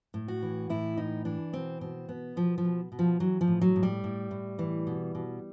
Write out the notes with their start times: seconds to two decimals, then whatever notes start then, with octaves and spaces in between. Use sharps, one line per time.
0.14 A2
0.28 F#4
0.42 E3
0.69 A2 E4
0.97 E3 D#4
1.25 E3 D4
1.53 B2 C4
1.81 B2 C4
2.09 B2 B3
2.36 B2 F3
2.58 F3
2.64 B2
2.92 B2
2.99 F3
3.20 E3 F#3
3.41 F3
3.48 A2
3.61 F#3
3.76 A2
3.83 G3
4.04 A2
4.31 A2
4.59 E3
4.87 B2
5.15 B2